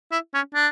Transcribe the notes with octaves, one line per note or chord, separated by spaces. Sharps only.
E4
C#4
D4